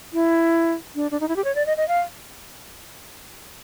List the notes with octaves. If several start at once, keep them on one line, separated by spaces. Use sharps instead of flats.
E4
D4
D4
D#4
E4
G4
C#5
D5
D#5
D#5
F5